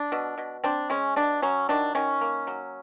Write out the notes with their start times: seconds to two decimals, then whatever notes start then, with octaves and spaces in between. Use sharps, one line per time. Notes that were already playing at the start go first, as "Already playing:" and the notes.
Already playing: D4
0.12 B2
0.38 B2
0.64 C4 D4
0.90 G#3 C#4
1.16 B2 D4
1.42 F#3 C#4
1.69 D#3 D4
1.95 D#3 C#4
2.21 A#3
2.47 F#3